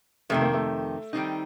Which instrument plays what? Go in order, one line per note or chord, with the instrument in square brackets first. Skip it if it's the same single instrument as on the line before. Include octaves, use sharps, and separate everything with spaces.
[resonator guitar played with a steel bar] F2 C3 D#3 [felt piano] A3
[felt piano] A#3
A3
[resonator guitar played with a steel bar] D#3 G3 C4 D#4